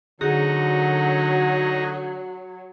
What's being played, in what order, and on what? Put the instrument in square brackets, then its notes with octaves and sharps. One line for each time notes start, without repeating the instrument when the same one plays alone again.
[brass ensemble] D3 [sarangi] F#3 [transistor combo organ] D#4 F#4 [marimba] G#4